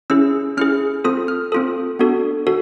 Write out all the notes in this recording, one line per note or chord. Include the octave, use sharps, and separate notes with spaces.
C#4 E4 G#4 E6
C#4 E4 G#4 F6
C4 F4 A4 D#6
F6
C4 F4 A4 D#6
B3 D4 F#4 A4
F#4 A4